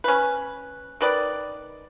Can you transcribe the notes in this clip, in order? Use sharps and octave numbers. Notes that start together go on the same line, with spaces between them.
C#4 B4
D#3 B4 D5